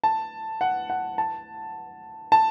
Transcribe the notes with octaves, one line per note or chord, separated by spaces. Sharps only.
A5
F#5
F#5
A5
A5